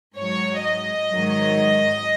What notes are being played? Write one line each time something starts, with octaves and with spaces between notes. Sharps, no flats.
G#2 F#3 C#5
D#5
G#2 D#3 F#3